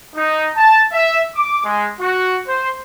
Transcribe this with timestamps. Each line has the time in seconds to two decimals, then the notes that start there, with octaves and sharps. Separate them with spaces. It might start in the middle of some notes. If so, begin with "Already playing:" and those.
0.15 D#4
0.57 A5
0.92 E5
1.35 D6
1.64 G#3
1.99 F#4
2.47 C5